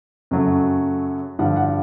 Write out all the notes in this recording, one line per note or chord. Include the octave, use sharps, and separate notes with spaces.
F#2 C#3 F#3 A3
G2 D3 F3 F#5
F#5